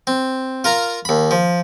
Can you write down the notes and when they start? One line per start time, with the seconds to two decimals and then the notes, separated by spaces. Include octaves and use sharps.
0.07 C4
0.64 F4 A#4 A#5
1.05 D#2 B5
1.31 F3